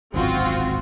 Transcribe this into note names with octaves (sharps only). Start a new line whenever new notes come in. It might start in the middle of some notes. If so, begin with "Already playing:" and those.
D1 G#1 F#2 C4 F4 F#4